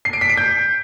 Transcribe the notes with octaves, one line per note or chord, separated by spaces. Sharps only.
C7
D7
B6
D7
G6